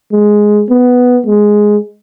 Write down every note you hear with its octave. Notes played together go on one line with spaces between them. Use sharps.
G#3
B3
G#3